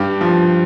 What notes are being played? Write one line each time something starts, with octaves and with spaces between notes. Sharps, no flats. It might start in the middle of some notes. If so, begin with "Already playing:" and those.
Already playing: G2 G4
F3